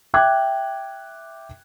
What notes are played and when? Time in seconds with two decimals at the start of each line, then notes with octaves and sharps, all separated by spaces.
0.14 E5 G5 D6 F#6 G#6